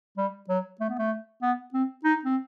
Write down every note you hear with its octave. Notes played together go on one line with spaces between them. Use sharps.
G3
F#3
A3
B3
A3
B3
C4
D#4
C4